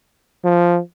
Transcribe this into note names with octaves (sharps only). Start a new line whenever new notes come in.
F3